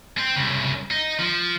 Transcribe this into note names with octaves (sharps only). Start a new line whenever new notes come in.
C4
C2 C#3
D#4
F3